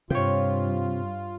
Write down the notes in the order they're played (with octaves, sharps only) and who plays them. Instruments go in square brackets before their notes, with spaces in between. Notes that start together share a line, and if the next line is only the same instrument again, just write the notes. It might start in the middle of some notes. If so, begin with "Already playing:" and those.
[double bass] G2 [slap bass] C3 [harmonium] F4 [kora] C#5 G5